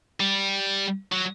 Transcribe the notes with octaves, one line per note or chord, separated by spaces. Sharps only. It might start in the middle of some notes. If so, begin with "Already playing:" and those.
G3
F#3